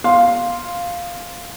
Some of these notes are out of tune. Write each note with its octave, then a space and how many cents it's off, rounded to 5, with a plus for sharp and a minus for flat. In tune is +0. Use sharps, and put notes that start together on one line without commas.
F5 +0 C6 +0